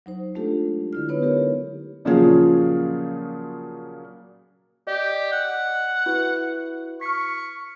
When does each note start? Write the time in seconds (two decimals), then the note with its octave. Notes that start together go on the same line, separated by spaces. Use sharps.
0.06 F#3 D#4 C5
0.35 G#3 A3 D4 F4 G4 A4
0.93 D3 E4 F6
1.09 B3 D#4 B4 C#5
1.22 G4 A#4 C#5
2.05 A#2 C#3 F3 F#3 F4 G#4
4.87 G4 D5 D#5
5.32 F#5
6.06 E4 F#4 B4
7.01 C#6 F6 B6